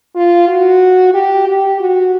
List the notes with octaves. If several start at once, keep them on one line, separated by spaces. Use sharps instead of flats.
F4
F#4
G4
G4
F#4